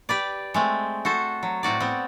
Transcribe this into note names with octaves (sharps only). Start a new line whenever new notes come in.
G4 B4 D5
G#3 A3 C4
F#4 A4 C5
F#3
A2 C4 F#4 D5
B3 C4